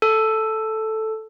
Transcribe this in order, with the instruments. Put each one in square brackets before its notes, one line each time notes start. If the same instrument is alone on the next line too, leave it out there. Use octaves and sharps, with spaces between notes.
[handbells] A4